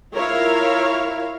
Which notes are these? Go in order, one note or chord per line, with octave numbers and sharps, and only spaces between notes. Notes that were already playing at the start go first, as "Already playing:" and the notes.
E4 F4 A#4 C#5 E5 F5